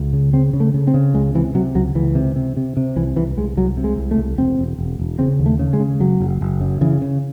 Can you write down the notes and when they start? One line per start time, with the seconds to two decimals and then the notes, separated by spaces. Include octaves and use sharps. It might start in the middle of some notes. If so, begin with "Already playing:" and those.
Already playing: C#2
0.13 C#3
0.33 C#3 C4
0.53 C#3
0.60 A3
0.74 C#3
0.87 C4
0.94 C#3
1.14 C#2 G#3
1.35 C3 E3
1.55 C3 F#3
1.75 C#2 F#3
1.95 C#2 E3
2.15 C3
2.36 C3
2.57 C3
2.77 C3
2.96 C2 E3
3.16 C2 E3
3.37 C2 G#3
3.57 C2 F#3
3.77 C3
3.84 G#3
3.98 C2
4.11 A3
4.18 C2
4.38 E1 C4
4.59 E1
4.79 E1
4.99 E1
5.19 C#3 C4
5.39 D#2
5.46 A3
5.59 C#3
5.73 G#3
5.80 C#3
6.00 F#1 F#3
6.20 F#1
6.41 F#1
6.61 F#2
6.81 C#3 E3
7.02 C#3